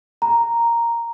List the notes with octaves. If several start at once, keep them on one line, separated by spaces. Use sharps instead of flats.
A#5